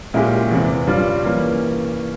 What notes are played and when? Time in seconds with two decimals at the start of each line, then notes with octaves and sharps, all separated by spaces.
0.14 A#2 G#3 C#4 E4 G4
0.51 E2 C3 E3
0.87 G2 G3 C#4 F4
1.24 E3 G3 A#3 C#4